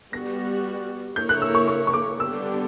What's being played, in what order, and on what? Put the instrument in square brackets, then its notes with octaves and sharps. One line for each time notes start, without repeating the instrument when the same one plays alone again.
[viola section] G3 B3 F#4 [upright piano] A#6
[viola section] A#3 E4 A#4 C#5 [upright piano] G6
[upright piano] F#6
E6
C#6
C#6
C#6
D6
[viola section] D3 G3 B3 D4 G4 [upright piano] E6